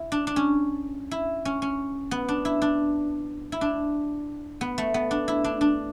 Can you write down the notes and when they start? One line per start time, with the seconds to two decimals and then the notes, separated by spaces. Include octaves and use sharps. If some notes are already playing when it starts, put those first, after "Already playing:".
Already playing: E4
0.12 D4
0.27 D4
0.36 C#4
1.11 E4
1.45 C#4
1.62 C#4
2.11 B3
2.29 D4
2.45 E4
2.62 D4
3.52 E4
3.61 D4
4.61 B3
4.78 A3
4.94 B3
5.11 D4
5.28 E4
5.44 D4
5.61 D4